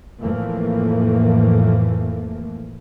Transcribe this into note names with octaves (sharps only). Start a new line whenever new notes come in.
F2 A2 E3 F3 A3 A#3